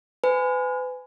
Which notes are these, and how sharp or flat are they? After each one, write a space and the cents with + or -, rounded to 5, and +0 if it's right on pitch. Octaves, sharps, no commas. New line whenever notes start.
B4 +35 G#5 +0